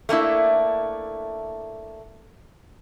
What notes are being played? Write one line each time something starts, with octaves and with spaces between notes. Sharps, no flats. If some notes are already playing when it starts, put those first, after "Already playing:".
A3 A#3 D4 E4